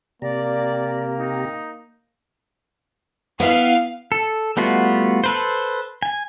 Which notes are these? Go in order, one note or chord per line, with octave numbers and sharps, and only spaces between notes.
C3 A#3 G4 D5 A#5
D#4
B3 E4 F5
A4
G3 A3 B3 F4 F#4
A4 B4 C5
G#5